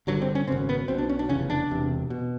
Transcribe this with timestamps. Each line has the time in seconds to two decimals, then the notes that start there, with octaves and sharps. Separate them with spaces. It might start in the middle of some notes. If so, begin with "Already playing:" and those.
0.07 G1 G2 D3 F#3
0.22 C4
0.35 C#4
0.47 G#1 F#2 C#3 C4
0.69 B3
0.88 B1 B2 C4
0.98 D4
1.09 C#4
1.19 D4
1.29 F1 E2 C#3 C#4
1.50 D4
1.70 E1 E2 C3
2.10 B2